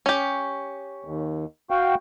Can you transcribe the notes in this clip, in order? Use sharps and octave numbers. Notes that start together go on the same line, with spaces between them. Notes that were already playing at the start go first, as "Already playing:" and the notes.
C#4 G4
D#2
F#4 F5 G5